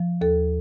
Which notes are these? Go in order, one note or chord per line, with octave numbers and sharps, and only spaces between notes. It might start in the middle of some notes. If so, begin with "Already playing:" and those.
Already playing: F3
D#2 A4